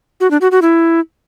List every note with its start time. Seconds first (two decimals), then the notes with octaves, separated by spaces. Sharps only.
0.20 F#4
0.31 D4
0.41 F#4
0.52 F#4
0.62 E4